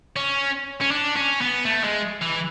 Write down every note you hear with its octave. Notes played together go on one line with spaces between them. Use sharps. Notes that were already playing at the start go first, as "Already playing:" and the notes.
C#4
C#4
D4
C#4
B3
A3
G#3
E3